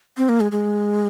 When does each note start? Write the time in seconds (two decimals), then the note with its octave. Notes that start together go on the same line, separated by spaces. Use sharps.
0.17 C4
0.29 A#3
0.40 G#3
0.52 G#3